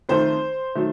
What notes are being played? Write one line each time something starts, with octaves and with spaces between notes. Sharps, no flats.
F2 D#3 A3 C5
D#3 F#3 A3